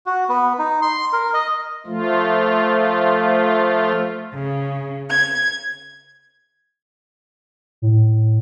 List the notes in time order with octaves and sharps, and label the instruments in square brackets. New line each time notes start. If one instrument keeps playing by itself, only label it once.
[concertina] F#4
B3
D#4
C6
A#4
D#5
[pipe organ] F3 A3 F4
[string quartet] C#3
G#6
[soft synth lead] A2